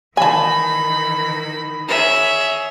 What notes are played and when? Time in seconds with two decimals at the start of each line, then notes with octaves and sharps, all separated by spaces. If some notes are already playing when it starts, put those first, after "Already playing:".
0.17 D#3 E3 G#5 A5 B5
1.88 G#4 C#5 E5